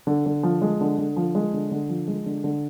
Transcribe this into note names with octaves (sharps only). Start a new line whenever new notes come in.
D3
D3
F3
G#3
D3
D3
F3
G#3
D3
D3
F3
G#3
D3
D3